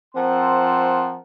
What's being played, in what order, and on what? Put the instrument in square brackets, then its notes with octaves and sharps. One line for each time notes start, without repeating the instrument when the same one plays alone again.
[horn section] F3 C4 A#4 F#5 A5 C6